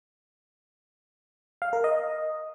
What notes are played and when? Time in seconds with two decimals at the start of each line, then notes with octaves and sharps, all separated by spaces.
1.62 F5
1.73 A#4
1.84 D#5